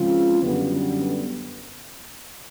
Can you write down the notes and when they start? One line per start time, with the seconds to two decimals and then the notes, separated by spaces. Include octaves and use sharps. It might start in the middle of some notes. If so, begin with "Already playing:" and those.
Already playing: C#3 F3 G#3 C4 F4
0.42 F#2 D3 G3 B3